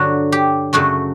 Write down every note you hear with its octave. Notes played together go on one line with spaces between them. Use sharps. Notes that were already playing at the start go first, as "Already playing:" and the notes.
Already playing: G2 D3 F#3 F#4
G4
F#2 C#3 F#3 A3 F#4